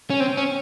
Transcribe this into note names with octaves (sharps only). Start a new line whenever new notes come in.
C#4
C4
C#4